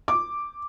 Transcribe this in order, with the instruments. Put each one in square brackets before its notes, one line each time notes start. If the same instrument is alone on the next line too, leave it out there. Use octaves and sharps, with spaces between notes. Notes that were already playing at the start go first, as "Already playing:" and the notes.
[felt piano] D6